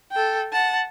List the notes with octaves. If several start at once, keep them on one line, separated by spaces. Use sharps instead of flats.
A4 G5
F#5 A5